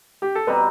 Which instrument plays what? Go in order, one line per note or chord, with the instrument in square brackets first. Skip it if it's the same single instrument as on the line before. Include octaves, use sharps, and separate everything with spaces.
[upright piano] G4
A4
[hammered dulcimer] B2 G3 C4 D#4 [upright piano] B4